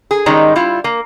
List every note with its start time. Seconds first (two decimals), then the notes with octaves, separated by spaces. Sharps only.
0.11 G#4
0.26 D#3 G3 G#3 C#4 D#4
0.56 G3 E4 F4
0.84 A#3